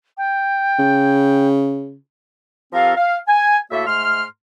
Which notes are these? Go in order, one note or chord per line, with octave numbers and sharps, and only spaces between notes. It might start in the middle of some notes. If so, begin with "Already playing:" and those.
G5
C#3
F3 C4 G4 A4 A#4 F5
F5
G#5
A2 A#3 F#4 A4 E5
G#2 A3 C6 F6